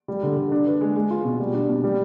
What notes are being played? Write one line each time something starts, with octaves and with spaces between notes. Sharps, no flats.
G3
D3
D3
D4
B4
G#3
G#3
F4
B2
G3
D4
B2
G3